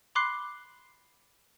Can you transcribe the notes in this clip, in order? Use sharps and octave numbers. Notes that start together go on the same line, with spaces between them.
B5 C6 D6 F#6 C7